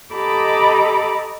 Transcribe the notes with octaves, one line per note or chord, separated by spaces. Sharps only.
G4 A4 D#5 A#5 B5 D6